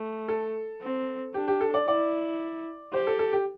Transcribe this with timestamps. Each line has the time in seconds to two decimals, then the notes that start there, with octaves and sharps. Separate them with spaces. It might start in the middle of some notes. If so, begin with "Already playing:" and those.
Already playing: A3
0.28 A4
0.82 C4
1.34 D4 G4
1.48 G4
1.61 A4
1.74 D5
1.87 E4 D5
2.93 G4 C5
3.07 A4
3.19 A4
3.33 G4